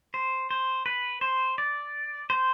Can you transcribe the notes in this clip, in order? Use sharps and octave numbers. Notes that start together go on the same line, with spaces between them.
C5
C5
B4
C5
D5
C5